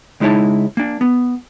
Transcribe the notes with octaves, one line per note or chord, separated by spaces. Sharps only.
C#2 G#3 D#4 E4 C#5 A5
A#3 D4
B3